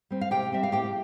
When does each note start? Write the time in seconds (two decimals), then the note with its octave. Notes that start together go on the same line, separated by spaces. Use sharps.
0.11 G3 C4
0.21 F5
0.31 C3 G4 G5
0.52 G3 C4 E5
0.63 F5
0.72 A2 G4 G5